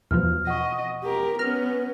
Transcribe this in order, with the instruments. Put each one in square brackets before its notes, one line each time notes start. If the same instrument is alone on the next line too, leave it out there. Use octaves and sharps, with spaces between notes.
[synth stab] E2 B2 F3 [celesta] F6
[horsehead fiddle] D#5 [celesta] F#5 C#6
[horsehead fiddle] G4 A#4
[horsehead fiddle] B3 C#4 [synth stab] F6 [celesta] A#6